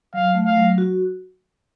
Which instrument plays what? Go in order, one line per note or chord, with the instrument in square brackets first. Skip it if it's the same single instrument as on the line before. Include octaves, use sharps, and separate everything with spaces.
[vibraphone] F#3 [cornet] F5
[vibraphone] A3
[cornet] F5
[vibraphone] F#3
F#4